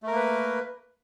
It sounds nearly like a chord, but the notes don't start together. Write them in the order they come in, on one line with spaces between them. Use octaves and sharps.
A3 A#4 A#3 B4